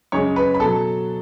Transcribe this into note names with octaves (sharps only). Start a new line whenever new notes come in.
F#2 C#3 G#3 C#5 C#6
B4 B5
B5
B2 F#3 A4 A5